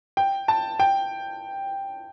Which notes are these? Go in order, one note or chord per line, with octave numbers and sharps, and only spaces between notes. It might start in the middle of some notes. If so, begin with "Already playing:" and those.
G5
A5
G5